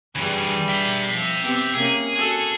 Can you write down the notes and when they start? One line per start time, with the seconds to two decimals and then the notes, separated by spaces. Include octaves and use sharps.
0.16 D2 G2 E3 G3 G#4
0.68 E5 G5
1.12 F3
1.42 B3 C4 G4
1.74 C3 A#3 C#4 G#4
2.14 F#4 A4